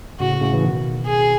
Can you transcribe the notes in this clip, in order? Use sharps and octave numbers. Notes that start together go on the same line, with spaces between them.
A2 C#3 F#4
A2 C#3
E3
B2 D#3
G#4